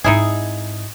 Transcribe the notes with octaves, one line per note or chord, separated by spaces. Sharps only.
G#2 C4 D#4 E4 G#4